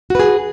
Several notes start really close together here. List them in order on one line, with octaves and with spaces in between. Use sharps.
F#4 B4 G#4